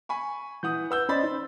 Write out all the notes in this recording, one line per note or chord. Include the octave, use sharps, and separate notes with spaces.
G#5 B5 C#6
E3 F#5 D#6 G6
B4 F#5 E6 G6
C#4 C5 D5 D#5 B5 A6
D#4